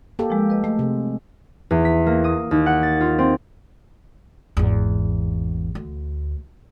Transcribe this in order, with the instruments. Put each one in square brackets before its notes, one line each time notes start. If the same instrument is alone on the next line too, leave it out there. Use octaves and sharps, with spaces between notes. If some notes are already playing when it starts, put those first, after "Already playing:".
[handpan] A#3 G4 A4
[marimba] F3 G#3
B4 D#5
[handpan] G#3 [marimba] A3
[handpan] C3
[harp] E2
B6
A#3
D#6
D#2
F#5
A6
F4
C4
[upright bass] G#1 E2
D2